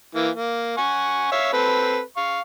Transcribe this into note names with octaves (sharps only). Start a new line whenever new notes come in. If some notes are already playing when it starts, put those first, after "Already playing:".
E3 A#3
A#3
F#5 G#5 C#6
C#5 E5 F5
C4 A4 B4
F5 C#6